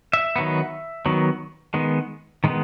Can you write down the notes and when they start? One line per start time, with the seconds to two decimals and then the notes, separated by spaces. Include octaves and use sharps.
0.13 E5
0.36 D#3 F#3 B3
1.06 D#3 F#3 B3
1.74 D#3 G#3 B3
2.44 D#3 G#3 B3